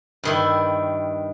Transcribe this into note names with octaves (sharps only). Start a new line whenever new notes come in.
G2 D#3 E4